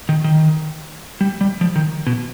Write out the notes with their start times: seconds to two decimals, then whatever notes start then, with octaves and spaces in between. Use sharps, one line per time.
0.09 D#3
0.24 D#3
1.21 G3
1.41 G3
1.61 F3
1.76 D#3
2.07 B2